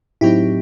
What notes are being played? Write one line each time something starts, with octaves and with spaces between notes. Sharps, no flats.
A2 F#3 C4 D#4 E4 G4